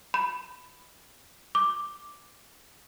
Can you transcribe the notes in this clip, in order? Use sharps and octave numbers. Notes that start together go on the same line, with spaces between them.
B5
D6